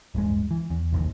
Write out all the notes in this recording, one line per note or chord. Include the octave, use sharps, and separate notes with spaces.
D1 A1 G2 G#3
E3
E2
F1 A#1 D#2